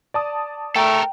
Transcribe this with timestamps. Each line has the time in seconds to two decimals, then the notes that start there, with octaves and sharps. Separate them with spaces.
0.14 D5 A5 D#6
0.76 A3 A4 A#4 G5 A#5